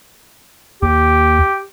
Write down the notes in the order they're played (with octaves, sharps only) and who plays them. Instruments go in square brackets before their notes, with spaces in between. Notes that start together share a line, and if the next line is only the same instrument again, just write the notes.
[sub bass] D#2 [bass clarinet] G4